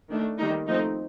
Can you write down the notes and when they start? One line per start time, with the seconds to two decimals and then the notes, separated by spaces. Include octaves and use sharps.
0.09 D#3 A3 D4
0.38 D#3 G3 A#3 D4 D#4
0.67 F3 A3 C4 D#4